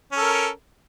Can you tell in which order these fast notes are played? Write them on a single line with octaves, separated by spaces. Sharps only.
C#4 A4 A#4